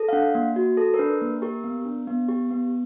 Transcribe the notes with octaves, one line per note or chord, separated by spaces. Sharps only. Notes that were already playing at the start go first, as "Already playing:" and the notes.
Already playing: A4
F5
D4 F#5
A#3
F#4
A4
A#4
D4 B4
A#3
G4 A#4
B3
D4
B3
G4
B3